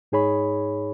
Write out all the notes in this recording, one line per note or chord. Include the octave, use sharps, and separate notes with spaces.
G#2 D#4 G#4 C#5 B5